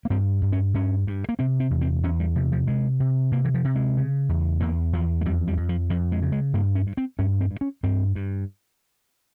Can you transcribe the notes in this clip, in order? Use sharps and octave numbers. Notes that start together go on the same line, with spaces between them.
A#3
G2 C4
G2
C#4
G2 C#4
G2
A#3
C3 C4
C4
E2
C4
E2 C#4
G3
C3 F3
F3
C3 G#3
C3
C3 A#3
E3
F3
C3
G#3
C#3
E2
E2 A#3
E2 F3
G#3
F2 G3
G3
F2
F3
F2 F3
G#3
C#3
G#3
G2 A#3
C#4
G2
C4
G2 C#4
C4
G2
C#4
G2 C4
G2